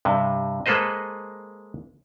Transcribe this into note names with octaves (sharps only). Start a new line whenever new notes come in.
G2 C3
G#3 A#3 A4 B4 C5 D#5